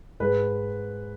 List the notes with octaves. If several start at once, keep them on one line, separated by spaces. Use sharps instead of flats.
G#2 B4